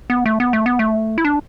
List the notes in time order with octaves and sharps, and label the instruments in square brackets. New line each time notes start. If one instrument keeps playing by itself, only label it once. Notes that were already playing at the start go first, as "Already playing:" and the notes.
[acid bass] B3
A3
B3
A3
B3
A3
E4
D4